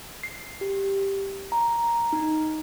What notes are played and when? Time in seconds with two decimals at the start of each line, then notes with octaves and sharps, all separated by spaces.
0.23 C7
0.61 G4
1.52 A#5
2.13 D#4